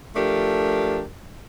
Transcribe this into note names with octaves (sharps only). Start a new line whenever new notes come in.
F3 A3 D4 G4 A#4